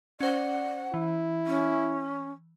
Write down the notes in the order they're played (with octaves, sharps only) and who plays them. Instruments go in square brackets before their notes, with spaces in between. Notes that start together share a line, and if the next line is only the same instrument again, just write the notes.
[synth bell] C#4 C5 [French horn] D5 [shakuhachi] F#5
[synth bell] E3 [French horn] E4
[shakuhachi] C#4